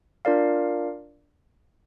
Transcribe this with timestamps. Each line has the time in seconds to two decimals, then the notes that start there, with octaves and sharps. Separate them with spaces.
0.25 D4 F4 A#4 D5 F5